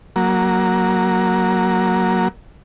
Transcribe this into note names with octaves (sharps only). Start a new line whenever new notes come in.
F#3 A#3